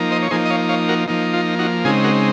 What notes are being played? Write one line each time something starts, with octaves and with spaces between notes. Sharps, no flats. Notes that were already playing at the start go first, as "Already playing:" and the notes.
Already playing: F3 A#3 D#4
C5 D#5
C#5
F3 A#3 D#4 G#4 C5
D#5
C#5 F5
C#5 F5
F#4 A#4
F3 A#3 D#4
F4
D#4 F#4
C#3 G#3 C4 D#4 F4 G#4
F#4 A#4